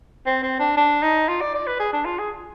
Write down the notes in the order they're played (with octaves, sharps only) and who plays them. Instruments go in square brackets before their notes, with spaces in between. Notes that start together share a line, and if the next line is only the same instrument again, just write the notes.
[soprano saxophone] C4
C4
D4
D4
D#4
F4
D5
D5
B4
G#4
D4
F4
G#4